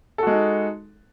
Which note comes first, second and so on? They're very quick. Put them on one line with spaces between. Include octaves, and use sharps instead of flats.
A4 F#4 G#3 D#4